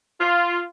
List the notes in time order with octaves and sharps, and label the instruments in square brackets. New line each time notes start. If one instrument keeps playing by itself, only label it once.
[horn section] F4